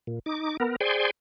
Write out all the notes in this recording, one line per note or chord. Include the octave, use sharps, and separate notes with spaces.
A#2
D#4 D6
B3 A#4
G#4 C5 D5 G5 G#5 C6